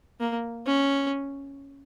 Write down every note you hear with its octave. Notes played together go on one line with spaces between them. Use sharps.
A#3
C#4